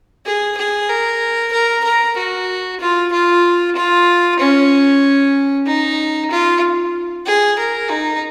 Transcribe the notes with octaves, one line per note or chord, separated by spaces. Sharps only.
G#4
G#4
A#4
A#4
A#4
F#4
F4
F4
F4
C#4
D#4
F4
G#4
A#4
D#4